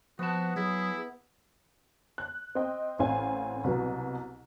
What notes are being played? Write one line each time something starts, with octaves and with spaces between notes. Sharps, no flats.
F3 B3 F#4 A5
F#3 E4 G#4
F#6
C4 C5 D#5 G5
A1 C4 F5 G#5
C2 B2 F#3 B3